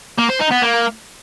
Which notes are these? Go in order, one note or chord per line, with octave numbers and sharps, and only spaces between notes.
A#3
C5
D#4
B3
A#3